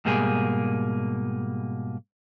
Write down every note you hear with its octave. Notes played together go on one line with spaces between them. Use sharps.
G#2 B2 G3 A#3 G#4